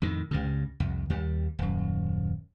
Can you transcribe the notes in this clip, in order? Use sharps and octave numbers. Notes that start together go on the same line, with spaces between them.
F2 A2 D#3
C#2 G2 C#3
C2 F2
D#2 G3
D#1 F#2